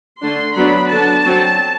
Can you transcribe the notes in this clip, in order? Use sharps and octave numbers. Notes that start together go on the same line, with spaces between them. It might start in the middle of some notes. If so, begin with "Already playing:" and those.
D3 A3 D4 C6
F#3 B3 D4 B5
D3 F#3 B3 D4 A5
F#3 C4